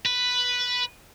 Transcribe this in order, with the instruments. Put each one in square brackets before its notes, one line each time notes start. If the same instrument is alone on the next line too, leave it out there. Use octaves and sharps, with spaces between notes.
[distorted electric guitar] B4